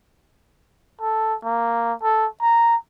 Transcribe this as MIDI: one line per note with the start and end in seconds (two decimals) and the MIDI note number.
1.01 1.35 69
1.44 1.93 58
2.03 2.27 69
2.41 2.76 82